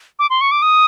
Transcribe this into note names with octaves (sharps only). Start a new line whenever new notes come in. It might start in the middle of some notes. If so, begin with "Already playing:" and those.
D6
C6
C#6
D6
D#6